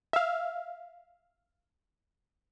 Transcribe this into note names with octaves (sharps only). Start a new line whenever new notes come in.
E5 F5